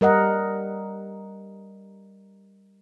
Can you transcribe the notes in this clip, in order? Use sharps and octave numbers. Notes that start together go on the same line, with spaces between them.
G3 A#4 D#5 F#5